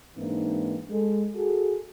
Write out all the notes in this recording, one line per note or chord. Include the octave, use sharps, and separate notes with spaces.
G#2 E3 A#3 C4 D4 D#4
G#3 A4
F#4 G#4 A4